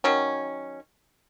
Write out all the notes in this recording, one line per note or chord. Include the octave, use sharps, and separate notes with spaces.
D#3 F#3 C#4